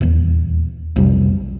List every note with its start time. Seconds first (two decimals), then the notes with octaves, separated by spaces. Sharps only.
0.01 D#1 E2
0.96 B1 F2 C3 G3